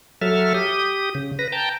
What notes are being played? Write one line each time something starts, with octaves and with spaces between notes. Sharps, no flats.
F#3 A4 E5 F6
G4 D#6
C#3
B4 A#6
G5 A5 A#5 G6